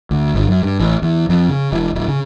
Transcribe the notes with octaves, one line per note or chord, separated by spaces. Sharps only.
D2
G1
F#2
G2
A1
E2
F2
C#3
E1
D1
C#3